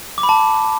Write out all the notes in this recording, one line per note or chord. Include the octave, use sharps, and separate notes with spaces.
D6
B5
A5